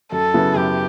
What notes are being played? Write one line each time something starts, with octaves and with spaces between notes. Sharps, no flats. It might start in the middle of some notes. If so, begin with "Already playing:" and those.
F#2 A4
C#3 F#3 B3 E4
F#2 G4